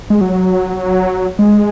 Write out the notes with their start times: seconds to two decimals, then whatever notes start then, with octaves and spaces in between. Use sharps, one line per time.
0.10 G#3
0.21 F#3
1.39 G#3